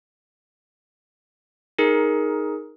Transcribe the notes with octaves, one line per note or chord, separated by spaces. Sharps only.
D#4 G#4 A#4